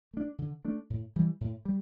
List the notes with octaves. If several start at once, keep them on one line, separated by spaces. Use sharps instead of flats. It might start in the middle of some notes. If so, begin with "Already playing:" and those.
A3 D4
D3
A3 D4
A2
E3 G3
A2
G3